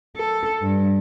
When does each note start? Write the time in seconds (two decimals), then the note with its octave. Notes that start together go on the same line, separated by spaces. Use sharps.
0.17 A4
0.62 G2